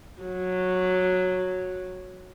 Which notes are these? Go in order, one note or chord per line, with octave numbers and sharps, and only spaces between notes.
F#3